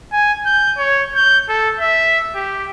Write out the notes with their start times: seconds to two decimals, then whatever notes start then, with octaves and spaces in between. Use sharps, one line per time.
0.13 G#5
0.46 G6
0.78 C#5
1.15 G6
1.49 A4
1.80 E5
2.35 G4